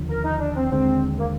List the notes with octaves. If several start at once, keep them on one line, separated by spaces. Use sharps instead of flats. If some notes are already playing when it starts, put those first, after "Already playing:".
Already playing: D#2 D3 F3
A#4
D#4
D4
C4
D#2 D3 G#3 C4
A#3